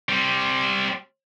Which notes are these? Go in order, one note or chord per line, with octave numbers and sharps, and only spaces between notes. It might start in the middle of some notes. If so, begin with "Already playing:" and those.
G3 C4